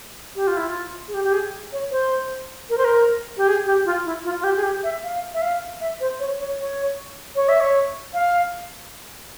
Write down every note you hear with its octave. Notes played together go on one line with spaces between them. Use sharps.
G4
F4
E4
F4
G#4
G4
G4
G#4
C#5
C5
A#4
C5
A#4
G4
G#4
G4
F4
E4
F4
F4
G4
G#4
G4
E5
F5
E5
F5
E5
C5
C#5
C#5
C#5
C#5
E5
C#5
F5